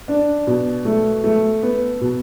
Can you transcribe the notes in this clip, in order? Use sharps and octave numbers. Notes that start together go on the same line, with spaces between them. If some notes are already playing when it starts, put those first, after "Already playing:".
D4
B2
A3
A3
B3
B2